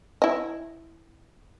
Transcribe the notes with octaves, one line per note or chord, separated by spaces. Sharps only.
E4 D#5